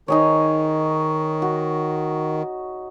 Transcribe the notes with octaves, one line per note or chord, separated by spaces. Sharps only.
D#3 D#4 G#4 C#5
F#4